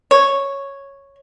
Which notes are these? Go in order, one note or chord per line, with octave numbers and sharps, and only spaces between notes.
C#5